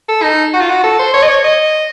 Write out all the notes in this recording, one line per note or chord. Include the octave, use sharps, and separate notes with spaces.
A4
D#4
F#4
F4
F#4
A4
C5
C#5
D#5
C#5
D#5